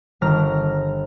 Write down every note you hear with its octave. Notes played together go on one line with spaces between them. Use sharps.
G1 D#3 A#5 F6